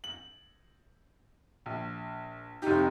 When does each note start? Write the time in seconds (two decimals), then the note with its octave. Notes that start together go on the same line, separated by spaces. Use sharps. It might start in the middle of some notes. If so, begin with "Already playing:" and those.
0.04 F#7
1.66 A#1
2.62 F1 D#4 G4